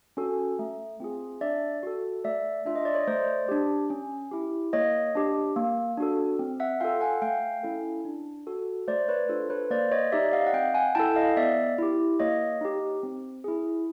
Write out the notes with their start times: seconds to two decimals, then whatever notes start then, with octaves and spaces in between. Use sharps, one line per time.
0.17 C#4 F#4 A4
0.59 A3
1.00 C4 F4 G#4
1.41 D4 D5 E5
1.83 F#4 A4
2.24 A3 D5 E5
2.65 D4 F4 E5
2.75 D#5
2.85 D5
2.94 C#5 D#5
3.07 A3 C5 D5
3.49 D4 G4
3.90 C#4
4.32 E4 G4
4.73 A#3 C#5 D#5
5.15 D4 G4
5.56 A#3
5.97 D4 F#4 A4
6.39 C4
6.60 E5 F#5
6.80 F4 A4 F5 G5
7.01 F#5 G#5
7.22 A3 F5 G5
7.63 C#4 E4 A4
8.05 D4
8.47 F#4 A4
8.88 A3 C5 D5
9.09 B4 C#5
9.29 D4 F4 A4 C5
9.50 B4 C#5
9.70 A#3 C5 D5
9.91 C#5 D#5
10.12 D#4 G4 D5 E5
10.33 D#5 F5
10.47 F#5
10.53 C4 F5 G5
10.74 F#5 G#5
10.95 E4 A4 G5 A5
11.16 D#5 F5
11.37 B3 D5 E5
11.78 E4 G4
12.19 A#3 C#5 D#5
12.61 D#4 G4
13.03 C4
13.44 E4 G#4